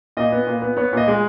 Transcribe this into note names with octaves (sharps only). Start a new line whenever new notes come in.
A#2 D#5
B3
A#2
B3
B3 C#5
A#2 D#5
G#3